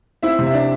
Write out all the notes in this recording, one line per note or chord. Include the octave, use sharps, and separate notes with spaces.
C4 E4 E5
C3
E5
D4 D5